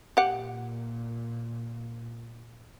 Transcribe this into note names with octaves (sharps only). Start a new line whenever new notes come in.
A#2 G4 F#5